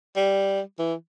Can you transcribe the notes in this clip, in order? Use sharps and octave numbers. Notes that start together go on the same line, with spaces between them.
G3
E3